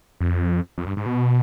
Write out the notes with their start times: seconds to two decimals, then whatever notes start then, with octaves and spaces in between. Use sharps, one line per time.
0.20 F2
0.78 F2
0.86 G2
0.97 G#2
1.06 B2